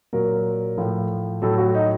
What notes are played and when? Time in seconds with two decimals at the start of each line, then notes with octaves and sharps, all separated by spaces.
0.13 A#2 F#3 A#4
0.78 A2 F3
1.42 A2 F#3 A4
1.58 F#4
1.75 D#4